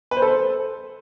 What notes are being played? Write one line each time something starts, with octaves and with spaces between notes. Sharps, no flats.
B4
C5
A4
C5